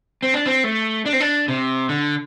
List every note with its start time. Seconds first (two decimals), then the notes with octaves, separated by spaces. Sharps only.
0.23 C4
0.34 D4
0.46 C4
0.64 A3
1.06 D4
1.13 C4
1.20 D4
1.48 C3
1.89 D3